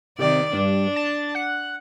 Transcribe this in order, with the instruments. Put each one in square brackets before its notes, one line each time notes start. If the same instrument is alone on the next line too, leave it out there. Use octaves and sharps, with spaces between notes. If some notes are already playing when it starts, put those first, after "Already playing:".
[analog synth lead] C3 [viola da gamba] D#3 D5
[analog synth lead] G2 [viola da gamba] D4
[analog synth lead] A5
F#5